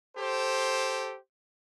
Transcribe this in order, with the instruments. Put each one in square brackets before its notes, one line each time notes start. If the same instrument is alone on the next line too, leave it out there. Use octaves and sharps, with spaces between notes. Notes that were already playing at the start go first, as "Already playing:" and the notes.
[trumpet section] G4 A4 C5